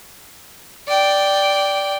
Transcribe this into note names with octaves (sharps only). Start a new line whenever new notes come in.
D5 G5